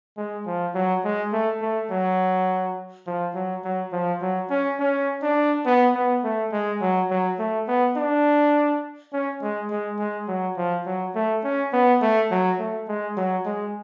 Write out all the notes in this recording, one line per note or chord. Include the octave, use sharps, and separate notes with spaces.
G#3
F3
F#3
G#3
A3
A3
F#3
F3
F#3
F#3
F3
F#3
C#4
C#4
D4
B3
B3
A3
G#3
F#3
F#3
A3
B3
D4
C#4
G#3
G#3
G#3
F#3
F3
F#3
A3
C#4
B3
A3
F#3
A3
G#3
F#3
G#3